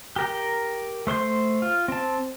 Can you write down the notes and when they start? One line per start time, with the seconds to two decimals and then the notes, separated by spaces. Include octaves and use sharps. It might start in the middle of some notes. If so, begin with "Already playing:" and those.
0.16 G4 A#4 G5
1.07 A3 C5 C6 G6
1.62 F4
1.88 C4 A5